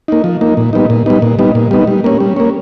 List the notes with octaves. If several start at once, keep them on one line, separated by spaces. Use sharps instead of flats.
A#3 D#4
F3
A#3 D#4
A#2
G3 B3 D#4
A#2
G3 B3 D#4
A#2
G3 B3 D#4
A#2
G3 B3 D#4
G3
A#3 C#4
G3
A#3 C#4